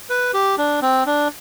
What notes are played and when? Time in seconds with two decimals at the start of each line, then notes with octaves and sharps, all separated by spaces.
0.10 B4
0.34 G4
0.58 D4
0.82 C4
1.06 D4